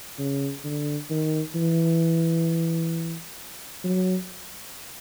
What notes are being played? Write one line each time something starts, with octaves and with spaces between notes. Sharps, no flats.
C#3
D3
D#3
E3
F#3